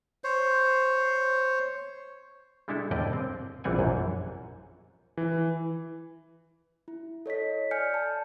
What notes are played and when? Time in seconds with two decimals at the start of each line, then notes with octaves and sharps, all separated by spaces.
0.24 C5 C#5
2.68 G3 G#3 D4 E4 A4
2.91 D#2 D3 G3 D5 D#5 G5
3.13 C4
3.64 A#1 E3 G3 C4 F#5 G#5
3.79 A#1 F#2 E3
5.17 E3
6.88 E4
7.26 A4 C#5 D#5 B6
7.71 D5 G#5 F6 G6 C#7
7.94 A5